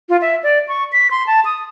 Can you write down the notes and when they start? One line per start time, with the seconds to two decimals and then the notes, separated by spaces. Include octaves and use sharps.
0.09 F4
0.22 E5
0.43 D5
0.68 C#6
0.92 B6
1.11 C6
1.27 A5
1.45 D#6